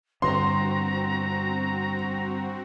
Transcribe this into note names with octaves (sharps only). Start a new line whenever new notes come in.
G2 D3 C4 F#4 A#5 C6